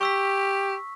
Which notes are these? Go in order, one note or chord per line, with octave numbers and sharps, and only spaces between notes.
G4 C#6 E6 B6